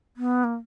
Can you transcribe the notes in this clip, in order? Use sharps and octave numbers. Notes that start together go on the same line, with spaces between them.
B3
A#3